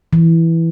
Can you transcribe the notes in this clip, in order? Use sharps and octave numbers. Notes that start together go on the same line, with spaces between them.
E3